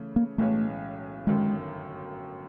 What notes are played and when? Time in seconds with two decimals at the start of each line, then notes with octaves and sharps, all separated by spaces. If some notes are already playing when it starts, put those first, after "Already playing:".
Already playing: C#3 E3 A3
0.16 A#3
0.38 B1 A2 E3 G#3 A3 C#4
1.27 G1 F#2 D#3 G#3